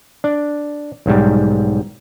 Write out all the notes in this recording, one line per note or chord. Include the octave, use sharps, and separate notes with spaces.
D4
B1 G#2 G3